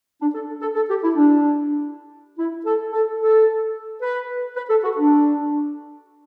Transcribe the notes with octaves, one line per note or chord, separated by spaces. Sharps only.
D4
A4
A4
A4
G4
E4
D4
E4
A4
A4
A4
B4
B4
A4
F#4
D4